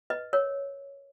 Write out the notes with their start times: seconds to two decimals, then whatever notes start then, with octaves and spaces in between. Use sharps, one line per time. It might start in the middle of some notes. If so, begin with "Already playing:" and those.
0.10 B4 D#5
0.33 A#4 C#5